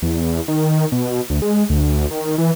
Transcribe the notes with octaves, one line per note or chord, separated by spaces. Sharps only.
E2
D#3
B2
D2
G#3
D2
D#3
E3